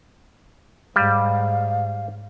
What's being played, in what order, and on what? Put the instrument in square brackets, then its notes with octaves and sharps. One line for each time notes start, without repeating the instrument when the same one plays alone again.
[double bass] G#2 [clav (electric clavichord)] G3 [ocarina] F5